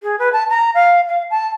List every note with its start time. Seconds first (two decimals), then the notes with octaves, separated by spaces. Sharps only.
0.03 G#4
0.19 B4
0.33 A5
0.50 A#5
0.74 F5
1.08 F5
1.30 A5